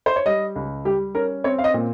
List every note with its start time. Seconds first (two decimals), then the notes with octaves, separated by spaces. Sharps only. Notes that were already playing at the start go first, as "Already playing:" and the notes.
0.06 C5
0.16 C#5
0.26 G3 D#5
0.56 C#2
0.85 G3 G4
1.15 C#4 A#4
1.44 C4 C#5
1.59 F5
1.64 D#5
1.74 A#2